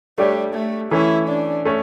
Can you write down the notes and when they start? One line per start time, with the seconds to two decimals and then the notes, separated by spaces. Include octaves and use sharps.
0.18 G3 A3 D4 G4 C#5
0.54 A3
0.91 E3 A3 C#4 E4
1.28 D4
1.65 A3 C#4